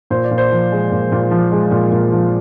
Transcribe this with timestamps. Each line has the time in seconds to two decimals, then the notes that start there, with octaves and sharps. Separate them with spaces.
0.10 A#2 C5
0.24 D5
0.31 A#2
0.38 C5
0.52 F3
0.72 G#3
0.92 A#2
1.12 A#2
1.31 F3
1.52 G#3
1.71 A#2 F4
1.92 A#2
2.12 F3